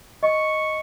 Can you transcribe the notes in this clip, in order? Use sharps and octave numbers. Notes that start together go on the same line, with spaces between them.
D#5 C#6